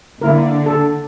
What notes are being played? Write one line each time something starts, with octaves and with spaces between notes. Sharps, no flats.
D3 A#3 E4 A#4
A4